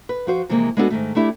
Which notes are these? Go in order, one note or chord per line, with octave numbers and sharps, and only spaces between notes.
B4
F3 F#4 C5
C3 E3 F3 G#3 A#3
G#3 B3 D4 E4 F#4 A4
G#2 D#3 A3
A3 D4 E4 G4